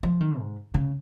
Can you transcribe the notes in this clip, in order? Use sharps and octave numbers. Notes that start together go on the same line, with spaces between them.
F3
D#3
G#2
C#3